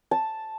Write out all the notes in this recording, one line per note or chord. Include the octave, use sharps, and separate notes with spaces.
A5